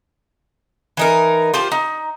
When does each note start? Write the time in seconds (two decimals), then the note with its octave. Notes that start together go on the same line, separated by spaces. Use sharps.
0.97 E3 D#4 A#4
1.54 F4 G4 C5 A5
1.72 D#4